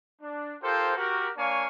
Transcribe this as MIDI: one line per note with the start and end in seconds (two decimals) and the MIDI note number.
0.22 0.54 62
0.63 0.95 65
0.63 0.95 67
0.63 0.95 69
0.63 0.95 70
0.63 0.95 72
0.97 1.30 66
0.97 1.30 67
0.97 1.30 70
1.36 1.67 58
1.36 1.67 62
1.36 1.67 73
1.36 1.67 77
1.36 1.67 80
1.36 1.67 85